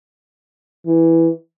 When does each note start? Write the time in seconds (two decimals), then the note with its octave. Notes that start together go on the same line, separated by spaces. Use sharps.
0.86 E3